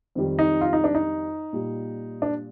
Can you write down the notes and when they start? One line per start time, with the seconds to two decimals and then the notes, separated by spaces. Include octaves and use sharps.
0.15 F2 D#3 G3
0.39 D#4
0.61 F4
0.73 D#4
0.84 D4
0.95 D#4
1.53 A#2 G3
2.22 D4